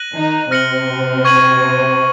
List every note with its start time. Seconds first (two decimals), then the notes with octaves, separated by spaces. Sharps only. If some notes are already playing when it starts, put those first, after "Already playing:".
Already playing: F#6 A#6 D#7 F#7
0.14 D#3 D#4
0.51 C3 C4 F6 A#6 C#7 F#7
1.25 C#6 G#6 D#7 F#7